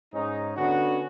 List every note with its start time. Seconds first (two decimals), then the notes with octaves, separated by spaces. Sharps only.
0.14 G#2 C#4 D#4
0.57 D3 B3 C#4 F#4